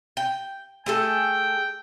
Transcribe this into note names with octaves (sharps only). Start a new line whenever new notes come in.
G5
A3 G#4 A4 G5